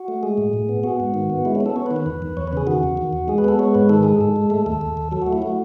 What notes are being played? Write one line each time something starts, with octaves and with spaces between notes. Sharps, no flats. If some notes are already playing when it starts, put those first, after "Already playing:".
Already playing: F#4
A3
G#3 G#4
A2
A2
B3
B3 F#4
G#2
D#3
B3
G#3 E4
C#4
B3
A4
B3 C#5
B4
D#3
B4
E2
E2
E2 C#5
B4
C#3 G#4
D#3 F#4
E2
D#3
E2
G#3 G#4
B4
B3 A4
G#3 C#5
G#2 B4
D#3 A4
G#3 G#4
A4
G#2
G#3
A3 A4
D#2 A4
D#2
D#2
F#3 A4
A3 F#4
E4
A3 F#4